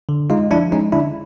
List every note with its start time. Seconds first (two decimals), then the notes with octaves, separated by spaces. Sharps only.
0.09 D3
0.30 G#3 D#4 F4
0.51 F3 D4 E4
0.72 G#3 C#4 D#4
0.92 D3 D4 E4